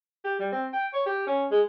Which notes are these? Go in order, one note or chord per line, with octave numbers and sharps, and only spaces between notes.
G4
G3
C4
G5
C#5
G4
C#4
G#3